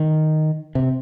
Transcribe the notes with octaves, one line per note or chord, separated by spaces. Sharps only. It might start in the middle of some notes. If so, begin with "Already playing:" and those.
Already playing: D#3
C3